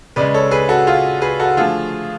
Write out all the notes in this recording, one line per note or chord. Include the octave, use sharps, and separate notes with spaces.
C#3 G#3 B4 D5
A4 C#5
G#4 B4
F#4 A4
F4 G#4
G#4 B4
F#4 A4
D3 F3 A3 F4 G#4